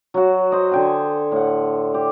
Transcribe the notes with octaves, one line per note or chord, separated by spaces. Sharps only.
F#3 F#4
C5 D#5
D3 G5 G#5
A2 F#5
G4